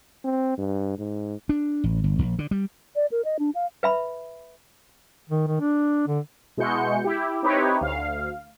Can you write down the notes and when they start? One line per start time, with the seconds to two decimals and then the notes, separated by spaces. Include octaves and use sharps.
0.24 C4
0.58 G2
0.98 G#2
1.49 D4
1.84 A1
2.04 G1
2.19 A#1
2.39 D3
2.51 G3
2.96 D5
3.12 A#4
3.25 D#5
3.39 D4
3.55 F5
3.83 B4 E5 B5
5.29 D#3
5.47 D#3
5.60 D4
6.08 D3
6.57 B2 G#3 E4 F#4 G6 C#7
7.04 E4 G4
7.43 C4 D#4 E4 G4 B4 C#5
7.81 D2 F5